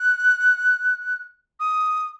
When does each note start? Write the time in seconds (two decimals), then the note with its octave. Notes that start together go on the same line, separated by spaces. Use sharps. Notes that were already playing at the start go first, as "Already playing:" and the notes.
Already playing: F#6
1.60 D#6